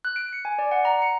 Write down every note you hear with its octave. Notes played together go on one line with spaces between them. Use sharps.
F#6
D7
C#7
G#5
D5
F#5
A#5
C#7